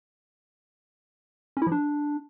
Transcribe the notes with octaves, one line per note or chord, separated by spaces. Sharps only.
C#4
E4
F3
D4